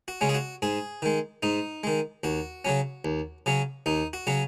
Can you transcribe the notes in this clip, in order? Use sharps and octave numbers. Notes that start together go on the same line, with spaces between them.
F#4
C#3 G#3 C#4
G#4
F#4
G#2 G#4
D#3 G#3
G#2 D#4
D#3 G#3
D#2 F#4
C#3 F#3 C#4
D#2
C#3 F#3 C#4
D#2 D#4
F#4
C#3 F#3 C#4